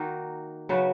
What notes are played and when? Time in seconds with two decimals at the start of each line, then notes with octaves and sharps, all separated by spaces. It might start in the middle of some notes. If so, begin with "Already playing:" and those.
Already playing: D#3 A#3 D#4 F#4
0.69 C#3 F#3 B3 F#4